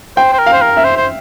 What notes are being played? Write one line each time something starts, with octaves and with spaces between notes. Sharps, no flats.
C5 G5
C5
A#4
F5
C5
A#4
E5
C5
C5